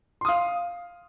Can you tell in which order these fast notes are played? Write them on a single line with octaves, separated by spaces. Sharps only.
C6 D#6 F5